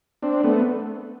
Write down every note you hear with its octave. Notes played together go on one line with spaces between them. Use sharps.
C4 D4
A3 B3